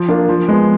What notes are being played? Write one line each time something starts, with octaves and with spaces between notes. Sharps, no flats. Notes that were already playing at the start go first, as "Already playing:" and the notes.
Already playing: F3
A#3 D4 F4
F3
G#3 B3